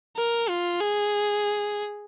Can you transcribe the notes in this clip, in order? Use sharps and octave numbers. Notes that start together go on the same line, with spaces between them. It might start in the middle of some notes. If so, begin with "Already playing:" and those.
A#4
F4
G#4